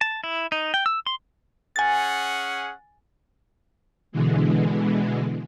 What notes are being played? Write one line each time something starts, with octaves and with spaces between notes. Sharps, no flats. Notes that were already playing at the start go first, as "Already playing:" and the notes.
A5
E4
D#4
G5
E6
C6
C#4 G#4 F#5 G#5 A6
B2 D3 E3 G#3